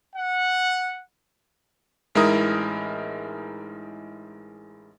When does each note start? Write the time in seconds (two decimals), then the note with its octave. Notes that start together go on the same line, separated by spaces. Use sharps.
0.16 F#5
2.15 A1 G#3 D#4 E4 A#4 D#6